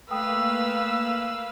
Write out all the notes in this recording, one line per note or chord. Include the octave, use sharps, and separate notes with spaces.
A3 A#3 B4 F5 G5 D#6 E6